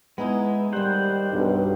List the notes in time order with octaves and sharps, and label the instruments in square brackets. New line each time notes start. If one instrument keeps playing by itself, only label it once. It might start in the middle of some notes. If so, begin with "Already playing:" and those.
[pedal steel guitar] G#3 [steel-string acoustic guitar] B3 D#4 E4
[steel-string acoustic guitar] D#2 D#3 [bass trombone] G3 [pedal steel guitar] C5 F#5
[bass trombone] B1 [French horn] G2